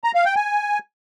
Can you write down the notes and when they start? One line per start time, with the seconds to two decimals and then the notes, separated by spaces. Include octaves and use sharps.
0.04 A#5
0.15 F5
0.25 G5
0.36 G#5